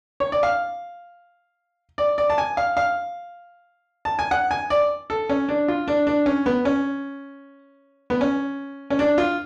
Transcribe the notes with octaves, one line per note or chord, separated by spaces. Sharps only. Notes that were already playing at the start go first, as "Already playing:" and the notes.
C#5
D5
F5
D5
D5
A5
G#5
F5
F5
A5
G#5
F#5
G#5
D5
A4
C#4
D4
F4
D4
D4
C#4
B3
C#4
B3
C#4
C#4
D4
F4